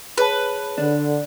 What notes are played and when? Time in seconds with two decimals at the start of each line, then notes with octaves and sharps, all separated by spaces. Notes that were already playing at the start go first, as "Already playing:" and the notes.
0.18 G#4 B4 C#5 A5
0.78 D3 D4